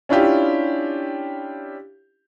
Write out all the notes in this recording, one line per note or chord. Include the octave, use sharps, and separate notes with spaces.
C#4 D4 E4 F4 G4